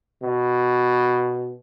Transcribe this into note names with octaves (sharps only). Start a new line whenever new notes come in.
B2